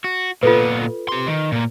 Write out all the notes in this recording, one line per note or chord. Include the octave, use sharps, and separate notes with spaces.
F#4
A#2 B3 F4 A4 B4
G4 C6
D#3
A#2 A#3